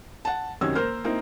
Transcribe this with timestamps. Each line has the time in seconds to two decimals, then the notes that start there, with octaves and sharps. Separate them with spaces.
0.25 F#5 A5
0.61 F#2 C3 D#3 C#4 E6 G#6
0.75 A#3 A#4 C5 F6
1.04 A#3 C4 D#4 E4